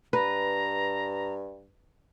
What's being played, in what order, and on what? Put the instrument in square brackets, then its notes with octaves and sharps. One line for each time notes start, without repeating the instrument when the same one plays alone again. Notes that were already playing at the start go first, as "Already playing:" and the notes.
[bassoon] G2 [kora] B4 [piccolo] A#5